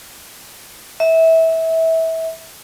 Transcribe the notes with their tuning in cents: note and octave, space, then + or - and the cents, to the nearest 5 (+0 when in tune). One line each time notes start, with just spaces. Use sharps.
E5 -20